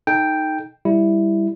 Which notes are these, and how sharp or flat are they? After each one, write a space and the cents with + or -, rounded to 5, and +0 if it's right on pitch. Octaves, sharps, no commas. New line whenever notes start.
D#4 +0 A4 -30 G5 +0
G3 +10 E4 +0